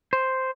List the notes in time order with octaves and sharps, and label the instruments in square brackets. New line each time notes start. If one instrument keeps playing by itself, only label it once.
[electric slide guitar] C5